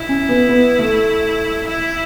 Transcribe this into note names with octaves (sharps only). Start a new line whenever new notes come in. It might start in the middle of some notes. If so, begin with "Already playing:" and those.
Already playing: E4
C#4
B3
B3
A3
E4